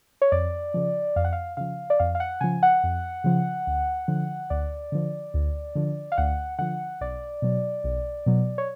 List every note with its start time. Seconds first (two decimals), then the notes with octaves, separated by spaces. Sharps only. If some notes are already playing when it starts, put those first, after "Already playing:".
0.22 C#5
0.32 F2 D5
0.74 C#3 F3
1.16 F2 F5
1.24 F#5
1.33 F5
1.57 C#3 F3 F5
1.90 D5
2.00 F2 F5
2.15 F5
2.20 F#5
2.41 C#3 F3 G#5
2.63 F#5
2.84 F2
3.24 C#3 F3
3.67 D2
4.08 D3 F3
4.50 D2 D5
4.92 D3 F3
5.34 D2
5.75 D3 F3
6.12 F5
6.18 D2 F#5
6.59 D3 F3 F#5
7.01 B1 D5
7.42 B2 F#3
7.84 B1
8.26 B2 F#3
8.58 C#5